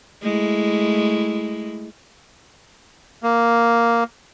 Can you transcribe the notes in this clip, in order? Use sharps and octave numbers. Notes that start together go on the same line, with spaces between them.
G#3 A3 E4
A#3